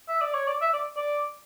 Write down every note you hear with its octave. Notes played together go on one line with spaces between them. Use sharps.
E5
D5
C#5
D5
E5
D5
D5